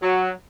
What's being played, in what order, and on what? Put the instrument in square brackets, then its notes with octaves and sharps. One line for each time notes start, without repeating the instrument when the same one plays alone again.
[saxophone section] F#3